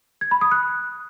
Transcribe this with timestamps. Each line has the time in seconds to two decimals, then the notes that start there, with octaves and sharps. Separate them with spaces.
0.21 G#6
0.31 B5
0.41 D#6
0.51 F#6